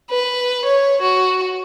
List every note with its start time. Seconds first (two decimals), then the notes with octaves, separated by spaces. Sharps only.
0.10 B4
0.65 C#5
1.02 F#4